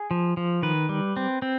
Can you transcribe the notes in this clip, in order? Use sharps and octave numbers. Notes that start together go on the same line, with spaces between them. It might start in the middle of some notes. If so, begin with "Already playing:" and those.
Already playing: G#4
F3
F3
D#3 B4
G3
C4
C4